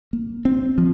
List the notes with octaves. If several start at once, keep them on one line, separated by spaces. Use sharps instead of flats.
A#3
C4
F3